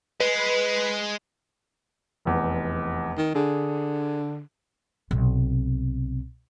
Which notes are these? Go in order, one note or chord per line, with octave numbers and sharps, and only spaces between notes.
G#3 B4
F1 E2
D#3
D3 G#4
B1 C3